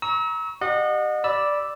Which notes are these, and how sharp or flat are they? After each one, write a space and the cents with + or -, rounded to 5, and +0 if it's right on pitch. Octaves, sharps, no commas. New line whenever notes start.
A#5 +25 C#6 +0 E6 -35
G4 -15 D#5 -35 F#5 -30
D5 +0 B5 -10 E6 +0